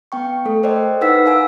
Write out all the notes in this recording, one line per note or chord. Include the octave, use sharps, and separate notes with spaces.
B3 G5 C#6
A3 A4
A#4 C5 D5 D#5 G5
D#4 E4 B4 F#5 E6 B6
A#4 F5 G#5 E6